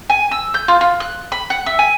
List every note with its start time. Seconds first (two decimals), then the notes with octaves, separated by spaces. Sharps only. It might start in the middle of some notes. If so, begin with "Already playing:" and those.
0.10 G#5
0.31 E6
0.54 G6
0.68 F4
0.81 F4
1.00 F#6
1.32 B5
1.50 F#5
1.66 E5
1.79 G#5